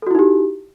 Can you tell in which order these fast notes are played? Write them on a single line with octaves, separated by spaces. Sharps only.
A4 F#4 E4 D#4 G4